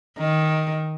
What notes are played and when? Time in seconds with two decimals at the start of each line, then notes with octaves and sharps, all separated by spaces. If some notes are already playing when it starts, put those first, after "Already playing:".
0.18 D#3